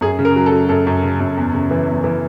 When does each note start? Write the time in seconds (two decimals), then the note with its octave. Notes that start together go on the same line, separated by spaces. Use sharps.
0.01 F#2 G#4
0.19 C#3
0.25 A#4
0.36 F#3
0.46 A4
0.52 F#3
0.69 F#2 A4
0.87 F#2
1.03 C#3
1.20 F#2
1.37 E2
1.53 C#3
1.71 E3
1.88 E2
2.04 E3